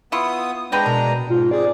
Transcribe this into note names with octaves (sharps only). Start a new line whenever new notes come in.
B3 E4 F4 C#6 D#6
G#3 C4 D4 B4 G5 A#5
B2 A#4
G#2 F4
C3 G#4 D5